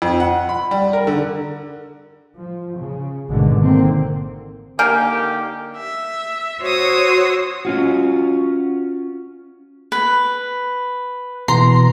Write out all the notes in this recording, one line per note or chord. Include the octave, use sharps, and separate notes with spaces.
F2
F#5
B5
G3
A#4
D3
F3
C#3
G#1 B2 D3 G#3
D3 D#3 A#3 C4
D3 A#3 D#4 G4 G#5 F6 G6
E5
F#4 C5 C#5 D#6 E6
C#4 F4 F#4
B4
B2 E3 A#5 C6